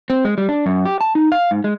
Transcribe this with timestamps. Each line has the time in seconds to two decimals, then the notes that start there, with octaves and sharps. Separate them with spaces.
0.10 C4
0.25 G#3
0.38 G3
0.49 D4
0.66 F#2
0.85 G4
1.01 A5
1.15 D#4
1.32 F5
1.51 G#2
1.64 G#3